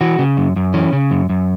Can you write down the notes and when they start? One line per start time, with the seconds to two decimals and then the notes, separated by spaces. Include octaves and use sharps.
0.01 E3 F#4
0.19 C#3
0.37 F#2
0.56 F#2
0.74 E3 C#4
0.93 C#3
1.11 F#2
1.30 F#2